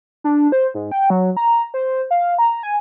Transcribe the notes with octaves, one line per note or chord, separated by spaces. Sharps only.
D4
C5
G#2
G5
F#3
A#5
C5
F5
A#5
G#5